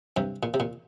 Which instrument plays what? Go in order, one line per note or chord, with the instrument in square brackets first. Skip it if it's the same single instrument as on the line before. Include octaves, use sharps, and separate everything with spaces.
[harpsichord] G2 C3
A#2
C3
A#2